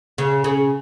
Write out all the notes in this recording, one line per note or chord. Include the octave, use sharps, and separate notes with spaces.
C#3
C#3